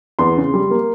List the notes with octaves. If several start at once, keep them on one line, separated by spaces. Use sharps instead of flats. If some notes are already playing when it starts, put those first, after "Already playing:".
E2 C6
C#3
G3
A#3